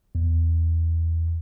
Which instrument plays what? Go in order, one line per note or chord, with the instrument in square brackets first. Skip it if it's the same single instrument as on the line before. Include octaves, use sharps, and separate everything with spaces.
[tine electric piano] E2